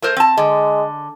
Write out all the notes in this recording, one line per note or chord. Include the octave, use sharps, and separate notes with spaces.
A3 A#4 C5
C4 A5
D3 G#3